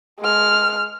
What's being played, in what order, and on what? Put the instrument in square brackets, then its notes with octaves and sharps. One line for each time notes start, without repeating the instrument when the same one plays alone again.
[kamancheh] G#3 F6